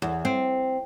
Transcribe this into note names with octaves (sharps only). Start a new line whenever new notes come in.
E2
C4